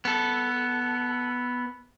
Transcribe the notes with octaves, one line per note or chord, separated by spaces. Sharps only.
B3 A4